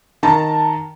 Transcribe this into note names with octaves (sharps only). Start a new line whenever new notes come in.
D#3 A5 A#5